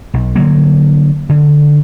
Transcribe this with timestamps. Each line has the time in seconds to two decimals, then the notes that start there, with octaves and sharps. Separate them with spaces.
0.14 B1
0.36 D3 F3 F#3 A#3
1.29 D3